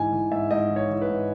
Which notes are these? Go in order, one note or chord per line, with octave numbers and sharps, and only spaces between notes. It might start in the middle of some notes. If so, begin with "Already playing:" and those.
Already playing: G#2 E3 G#5
E3
G#2 E5
G#2 D#5
E3
C#5
E3
B4
G#2